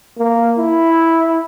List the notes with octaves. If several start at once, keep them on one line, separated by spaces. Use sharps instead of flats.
A#3
E4